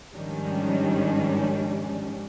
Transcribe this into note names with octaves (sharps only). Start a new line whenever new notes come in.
G#2 D#3 F3 G3 C#4 D4